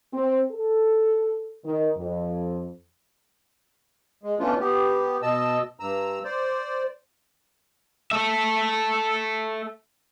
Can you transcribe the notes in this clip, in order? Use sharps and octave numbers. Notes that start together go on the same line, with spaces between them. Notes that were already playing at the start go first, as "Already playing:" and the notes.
C4
A4
D#3
F2
G#3
B2 E3 A3 C#4 D4 F4
B3 G4
B2 D#5 A5 E6
G2 A#5 E6
C5 D5
A4 E5